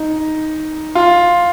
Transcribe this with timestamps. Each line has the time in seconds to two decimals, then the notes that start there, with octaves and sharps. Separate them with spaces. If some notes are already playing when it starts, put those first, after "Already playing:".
Already playing: D#4
0.95 F4